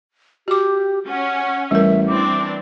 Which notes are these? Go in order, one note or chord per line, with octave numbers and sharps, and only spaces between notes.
F#4 G4 D6
C#4 F#5
A1 G3 A#4 E5
E3 C4 D4 D6